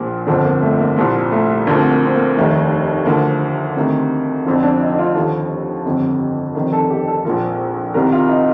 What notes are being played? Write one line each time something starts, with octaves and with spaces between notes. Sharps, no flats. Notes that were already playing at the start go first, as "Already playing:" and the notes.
Already playing: A#1 A#2 F3 A#3
G1 F2 D3 F3 C4
A#3
A3
A#3
C2 A#2 F3
A3
D2 D3 F3 A#3
C4
A#3
C4
A#3
F1 D#2 D#3 A3
D2 D3 F3 A#3
D2 C3 D#3
F1 F2 D3 F3 C4
D4
D#4
F4
D#2 D3 F3 A4
G1 F2 C3
F1 F2 C3 D#3
A4
G4
A4
A#1 A#2 F3 A#4
C2 C3 D#3 A#4
F4
D#4